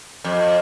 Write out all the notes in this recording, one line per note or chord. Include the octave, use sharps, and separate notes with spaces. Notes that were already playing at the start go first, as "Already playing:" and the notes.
F2